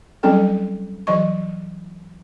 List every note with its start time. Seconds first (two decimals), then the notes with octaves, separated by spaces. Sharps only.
0.23 F#3 G3 C4 C#4 A4 G5
1.07 E3 F#3 D#5 C#6